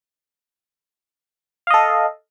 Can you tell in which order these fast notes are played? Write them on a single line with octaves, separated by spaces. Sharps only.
F5 D#5 A4